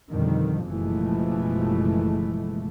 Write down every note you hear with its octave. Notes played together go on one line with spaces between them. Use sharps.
F2 B2 D3 D#3 G3
F#1 B2 E3 F3 G#3 A3